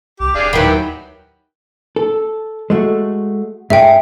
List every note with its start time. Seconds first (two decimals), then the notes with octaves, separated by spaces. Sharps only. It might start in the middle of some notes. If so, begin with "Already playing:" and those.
0.20 C2 G4
0.35 E1 D4 G#4 F5
0.53 D#2 D#3 E3 F#3 G5 B5
1.96 A4
2.70 G#3 A3 F#4
3.70 G#2 G#4 D#5 E5 G5